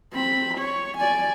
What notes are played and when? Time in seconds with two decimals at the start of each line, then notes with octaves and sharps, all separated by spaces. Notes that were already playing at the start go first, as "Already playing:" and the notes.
0.12 C4 B5
0.58 C#5
0.98 D5 G#5